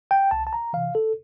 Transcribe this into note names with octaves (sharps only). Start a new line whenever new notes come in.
G5
C2 A5
A5
A#5
C3 E3 F5
A4